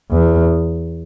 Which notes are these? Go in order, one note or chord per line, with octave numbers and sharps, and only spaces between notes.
E2